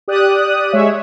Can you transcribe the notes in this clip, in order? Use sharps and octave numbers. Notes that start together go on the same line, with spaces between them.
G4 D5 D#6 F#6
G#3 C#5 E5